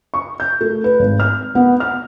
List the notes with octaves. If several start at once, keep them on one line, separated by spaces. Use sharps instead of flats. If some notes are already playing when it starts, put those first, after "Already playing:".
C#6
G6
A3
B4
G#1
F6
B3
F6